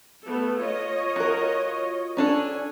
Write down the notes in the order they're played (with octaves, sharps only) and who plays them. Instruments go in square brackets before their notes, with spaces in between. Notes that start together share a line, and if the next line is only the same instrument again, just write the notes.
[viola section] A3 B3 A4
F4 C#5 D#5
[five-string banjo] F#4 A#4
[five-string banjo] C#4 D4 A4 [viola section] G#5